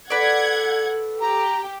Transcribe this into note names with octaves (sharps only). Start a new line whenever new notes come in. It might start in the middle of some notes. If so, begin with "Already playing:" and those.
A4 B4 D5 F#5 G#6
G4 A#5